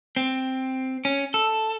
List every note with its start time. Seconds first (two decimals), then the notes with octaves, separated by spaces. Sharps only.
0.16 C4
1.05 C#4
1.34 A4